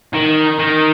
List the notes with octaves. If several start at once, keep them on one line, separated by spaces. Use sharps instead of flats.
D#3
D#3